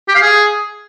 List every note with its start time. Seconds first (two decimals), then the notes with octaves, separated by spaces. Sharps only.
0.08 G4
0.15 F5
0.22 G#4